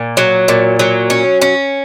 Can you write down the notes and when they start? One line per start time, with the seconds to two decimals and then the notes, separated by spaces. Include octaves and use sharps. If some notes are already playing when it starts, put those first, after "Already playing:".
Already playing: A#2
0.17 F#3
0.48 A#2
0.79 F#3
1.10 C#4
1.41 C#4